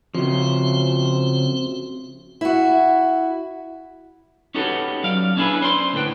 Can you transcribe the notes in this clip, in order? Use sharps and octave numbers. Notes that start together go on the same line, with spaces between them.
C#3 F3 C4 F#4
E4 F#4
C#4 D#4 F#4 G4 A4 B4
F#3 D5 F5
C#4 D4 E4 G4 G#4 B4
C5 D5 C6
D2 A2 B4 G5